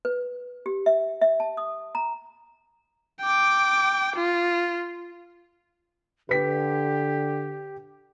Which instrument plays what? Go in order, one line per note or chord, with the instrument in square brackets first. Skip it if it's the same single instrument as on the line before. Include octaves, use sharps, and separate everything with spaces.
[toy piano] B4
G4
E5
E5
A5
D#6
A#5
[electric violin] G5 D6
F4
[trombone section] D3 [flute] G4 [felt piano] B4 B6